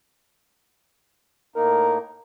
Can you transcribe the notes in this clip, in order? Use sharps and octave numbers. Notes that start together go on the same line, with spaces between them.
A2 A#3 D#4 A#4